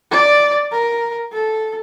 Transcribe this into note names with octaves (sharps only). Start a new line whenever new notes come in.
D5
A#4
A4